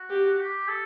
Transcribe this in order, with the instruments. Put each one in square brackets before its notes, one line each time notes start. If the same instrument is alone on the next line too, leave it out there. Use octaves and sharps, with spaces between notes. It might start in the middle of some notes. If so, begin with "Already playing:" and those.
Already playing: [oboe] F#4
[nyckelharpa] G4
[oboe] G4
A4